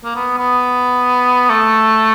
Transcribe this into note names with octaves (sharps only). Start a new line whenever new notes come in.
A#3
B3
B3
A3